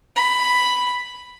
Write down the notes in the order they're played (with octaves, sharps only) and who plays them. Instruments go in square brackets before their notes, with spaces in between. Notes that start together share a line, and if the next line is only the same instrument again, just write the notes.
[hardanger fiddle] B5